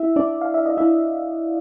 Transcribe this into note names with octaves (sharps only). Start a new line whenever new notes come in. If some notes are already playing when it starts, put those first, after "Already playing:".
Already playing: E4 E5
D4 D5
F5
E5
D#5
E4 E5